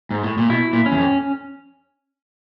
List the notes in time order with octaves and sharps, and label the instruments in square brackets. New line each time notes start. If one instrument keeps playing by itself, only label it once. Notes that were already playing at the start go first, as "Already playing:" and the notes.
[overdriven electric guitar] G#2
A2
A#2
[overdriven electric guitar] B2 [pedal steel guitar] E4
[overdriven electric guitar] A#2
[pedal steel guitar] C#4
[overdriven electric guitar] E2
F2